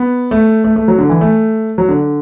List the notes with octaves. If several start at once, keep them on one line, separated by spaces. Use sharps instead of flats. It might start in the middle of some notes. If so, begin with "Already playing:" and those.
Already playing: B3
A3
A3
A3
F#3
D3
E3
A3
F#3
D3